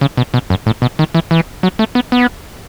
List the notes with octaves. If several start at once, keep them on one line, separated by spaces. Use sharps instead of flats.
C#3
B2
B2
F#2
A2
B2
D#3
E3
E3
F#3
A3
B3
B3